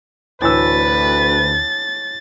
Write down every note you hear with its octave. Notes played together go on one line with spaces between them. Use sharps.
D2 A2 E3 B4 E6 A6